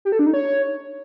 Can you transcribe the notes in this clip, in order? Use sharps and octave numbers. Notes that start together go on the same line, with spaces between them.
G4
A4
D4
D#4
C#5